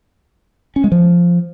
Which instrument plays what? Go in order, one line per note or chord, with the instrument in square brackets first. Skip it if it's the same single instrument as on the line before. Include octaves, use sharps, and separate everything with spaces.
[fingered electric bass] C#4
G#3
F3